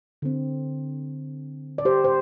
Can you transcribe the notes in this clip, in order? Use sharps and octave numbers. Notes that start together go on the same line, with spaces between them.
D3 C4
D5
G4 C5
C5